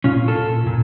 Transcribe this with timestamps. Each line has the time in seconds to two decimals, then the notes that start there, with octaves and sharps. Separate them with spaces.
0.04 A#2 C#4 F4
0.28 F4 A4
0.36 A#2
0.66 A#2